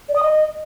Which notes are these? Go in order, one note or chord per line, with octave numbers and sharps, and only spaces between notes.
D5
D#6
D#5